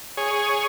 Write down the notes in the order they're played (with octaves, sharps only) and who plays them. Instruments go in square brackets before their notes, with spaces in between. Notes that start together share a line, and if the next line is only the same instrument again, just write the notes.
[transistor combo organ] G#4 C#5